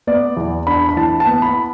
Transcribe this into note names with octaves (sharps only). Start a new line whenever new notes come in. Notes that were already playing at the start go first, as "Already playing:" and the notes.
B3 D5
E2
D4 B5
B5
E3 A5
A5
B3
B5